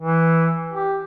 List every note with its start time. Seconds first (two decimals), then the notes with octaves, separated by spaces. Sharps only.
0.01 E3
0.73 G4